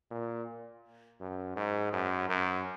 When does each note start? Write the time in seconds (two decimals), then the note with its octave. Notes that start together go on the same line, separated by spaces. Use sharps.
0.11 A#2
1.20 F#2
1.56 G#2
1.93 F#2
2.29 F#2